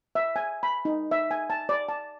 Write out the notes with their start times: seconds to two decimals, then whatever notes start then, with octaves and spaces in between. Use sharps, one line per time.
0.15 E5
0.36 G#5
0.63 B5
0.85 D#4
1.11 E5
1.31 G#5
1.50 A5
1.69 D5
1.89 A5